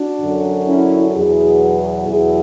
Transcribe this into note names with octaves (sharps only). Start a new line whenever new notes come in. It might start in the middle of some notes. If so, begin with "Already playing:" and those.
Already playing: D4 F#4
F#2 D3 F#3
C#4 E4
E2 B2 F#3 E4 G#4
E2 B2 F#3 E4 G#4